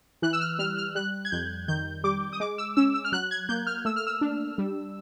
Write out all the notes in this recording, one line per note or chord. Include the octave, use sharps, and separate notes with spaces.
E3 F#6
E6
F6
G3 F6
F6
G3 F#6
G#6
F2 G6
D#3 G6
G3 D6
D#6
G#3 D6
E6
C#4 E6
E6
F6
F#3 F#6
G#6
A#3 G6
F6
A3 E6
F6
E6
D4
G3